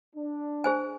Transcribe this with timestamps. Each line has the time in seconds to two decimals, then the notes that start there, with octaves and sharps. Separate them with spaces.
0.16 D4
0.64 G#4 C5 G#5